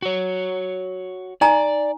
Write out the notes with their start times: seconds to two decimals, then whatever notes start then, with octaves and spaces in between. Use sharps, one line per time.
0.02 F#4 C#5
1.41 D#4 D5 G#5 A#5